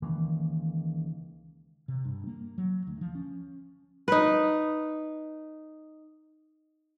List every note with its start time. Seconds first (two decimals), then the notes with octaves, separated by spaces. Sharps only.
0.02 C#2 D#3 E3 A#3
1.88 C3
2.05 G2
2.27 A#3
2.58 F#3
2.87 D2
3.01 F3
3.15 C#4
4.08 D#4 B4